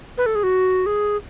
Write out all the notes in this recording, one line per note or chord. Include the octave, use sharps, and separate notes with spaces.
B4
A4
G#4
F#4
G#4